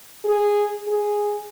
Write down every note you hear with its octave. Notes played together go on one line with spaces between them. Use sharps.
G#4
G#4